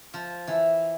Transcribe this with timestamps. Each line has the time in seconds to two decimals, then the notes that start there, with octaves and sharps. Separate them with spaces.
0.14 F3
0.47 E3